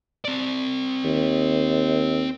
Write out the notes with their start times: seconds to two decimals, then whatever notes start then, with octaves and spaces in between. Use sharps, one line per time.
0.25 C4 D5
1.04 D#2